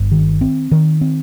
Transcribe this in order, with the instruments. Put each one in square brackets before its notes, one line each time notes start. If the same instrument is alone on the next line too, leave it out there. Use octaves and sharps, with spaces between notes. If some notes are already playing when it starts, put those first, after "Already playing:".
Already playing: [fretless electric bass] G1
D#3
C4
D#3
C4